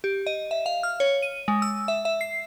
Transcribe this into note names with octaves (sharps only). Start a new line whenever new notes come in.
G4
D#5
E5
F5
F6
C#5
D#7
G#3
E6
E5
E5
C7